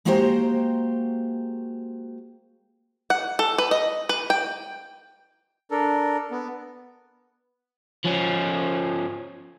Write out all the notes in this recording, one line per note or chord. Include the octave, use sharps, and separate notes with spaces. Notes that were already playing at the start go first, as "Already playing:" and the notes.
G#3 A#3 F#4 G4 C5 A#5
F#5
A4
B4
D#5
B4
G5
D4 A4 A#4
B3
F3 C#4